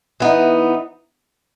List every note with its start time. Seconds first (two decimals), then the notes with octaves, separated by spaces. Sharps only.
0.20 E3 B3 D#4